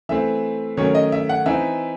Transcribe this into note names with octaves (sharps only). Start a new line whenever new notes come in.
E3 A3 C4 E5
D#3 F#3 A3 C#4 C#5
D#5
E5
F#5
E3 C4 D#4 E5